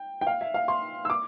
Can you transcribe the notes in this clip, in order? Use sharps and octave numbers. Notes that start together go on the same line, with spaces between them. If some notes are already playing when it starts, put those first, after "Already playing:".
Already playing: G5
G5
F5
E5
F5
C6
E6
D6